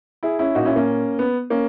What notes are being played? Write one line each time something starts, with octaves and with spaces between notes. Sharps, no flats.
E4 G#4
C#4 E4
A#2 D#4 F#4
C#4 E4
A#3 C#4
B3
A#3 C#4